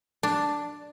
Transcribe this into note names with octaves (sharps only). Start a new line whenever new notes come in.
D4